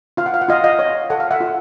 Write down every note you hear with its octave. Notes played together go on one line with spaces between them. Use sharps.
F4 F5
F#5
F5
F#5
F4 D#5 F5
D#5 F5
C#5
A4 F#5
F5
E5 F#5
F4